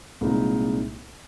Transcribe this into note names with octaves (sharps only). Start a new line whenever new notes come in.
C2 A#2 G#3 D#4